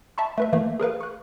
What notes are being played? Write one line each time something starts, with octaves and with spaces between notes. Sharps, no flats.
E5 A5 B5 C#6
A3 B4 E5
E3 A3 A#3
G#4 A#4 B4 F5
C#6 F#6